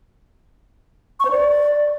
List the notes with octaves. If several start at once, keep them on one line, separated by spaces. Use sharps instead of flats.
C#6
C5
D5